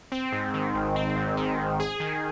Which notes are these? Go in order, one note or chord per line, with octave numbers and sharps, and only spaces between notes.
C4
G#2
D#3
G#1
C4
G#2
D#3
G#1
G#4
D#3